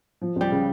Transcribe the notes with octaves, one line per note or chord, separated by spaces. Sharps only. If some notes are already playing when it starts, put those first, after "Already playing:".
F3
C#2 G3
C#3